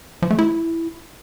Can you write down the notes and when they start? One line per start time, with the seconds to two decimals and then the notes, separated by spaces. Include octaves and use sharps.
0.22 F3
0.30 A3
0.39 E4